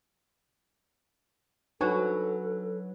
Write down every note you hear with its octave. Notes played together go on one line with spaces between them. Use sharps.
F#3 D4 D#4 F#4 A4 B4 G#5